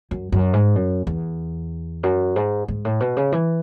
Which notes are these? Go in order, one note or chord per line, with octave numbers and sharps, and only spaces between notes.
F#2
F#2
G#2
F#2
E2
F#2
G#2
G#2
A2
B2
C#3
E3